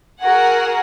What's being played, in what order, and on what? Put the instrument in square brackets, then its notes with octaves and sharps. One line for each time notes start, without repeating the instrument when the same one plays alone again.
[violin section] F#4 G#4 A#4 F#5